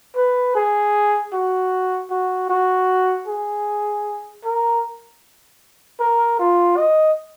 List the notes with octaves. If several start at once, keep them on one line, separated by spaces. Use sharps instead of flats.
B4
G#4
F#4
F#4
F#4
G#4
A#4
A#4
F4
D#5